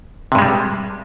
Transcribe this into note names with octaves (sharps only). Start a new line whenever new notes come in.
G2 C3 G3 G#3